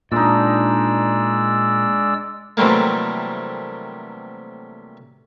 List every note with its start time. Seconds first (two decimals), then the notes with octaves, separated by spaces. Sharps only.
0.12 A#2 G#3 D4 D#4 D5 E6
2.57 C3 E3 F#3 G3 A3 A#3